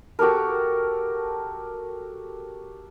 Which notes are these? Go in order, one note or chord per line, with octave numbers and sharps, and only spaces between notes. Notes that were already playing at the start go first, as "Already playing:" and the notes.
F#4 G4 A4 A#4